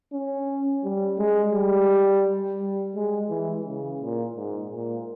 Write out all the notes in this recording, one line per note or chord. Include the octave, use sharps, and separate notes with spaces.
C#4
G3
G#3
G3
G3
G#3
E3
C#3
A#2
G#2
A#2